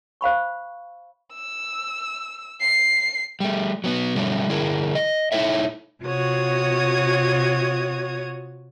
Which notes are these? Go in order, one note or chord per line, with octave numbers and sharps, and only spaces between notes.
C5 F5 B5 C#6
E6
C7
G3 A3
F#3 B3
G2 B2 D3 F#3 G3 A3
G2 D3 E4 G#4 A#4
D#5
D#4 E4 A4 C#5 E5
C3 F4 F#4 C#5 D#6 G#6